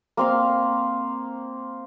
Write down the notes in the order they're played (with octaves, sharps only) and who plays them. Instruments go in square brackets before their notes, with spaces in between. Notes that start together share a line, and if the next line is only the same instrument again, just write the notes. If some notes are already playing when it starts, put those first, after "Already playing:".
[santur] A#3 C4 F5